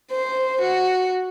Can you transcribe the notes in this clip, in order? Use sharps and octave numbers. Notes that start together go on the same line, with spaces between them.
C5
F#4